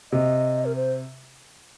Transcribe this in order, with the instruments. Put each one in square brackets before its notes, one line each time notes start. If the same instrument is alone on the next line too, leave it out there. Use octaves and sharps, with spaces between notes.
[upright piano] C3 [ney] D#5
[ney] A#4
C5